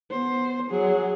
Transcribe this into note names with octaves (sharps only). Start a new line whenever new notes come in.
B3 C5
F#3 G#4